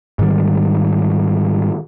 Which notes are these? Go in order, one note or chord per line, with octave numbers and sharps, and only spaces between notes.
G#2 D#3 G3